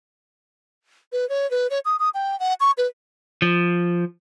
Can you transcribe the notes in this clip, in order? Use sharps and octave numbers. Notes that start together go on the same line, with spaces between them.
B4
C#5
B4
C#5
D#6
D#6
G5
F#5
C#6
B4
F3